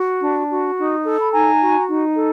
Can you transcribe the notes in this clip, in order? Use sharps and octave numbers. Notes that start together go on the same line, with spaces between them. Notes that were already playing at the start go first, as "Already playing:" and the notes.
Already playing: F#4
D4
F#4
D#4
A4
B5
D#4 G#5 A#5
F#4
D#4
A4